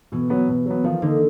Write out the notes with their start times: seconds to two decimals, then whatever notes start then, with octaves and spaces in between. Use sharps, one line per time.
0.12 B2 E3
0.30 F#3 B3
0.48 B2
0.66 F#3 B3
0.84 D#3 F3
1.02 D3 A#3 D#4